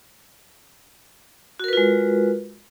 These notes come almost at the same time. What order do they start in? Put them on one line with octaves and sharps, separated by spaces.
F#4 A#4 B4 F4 G#3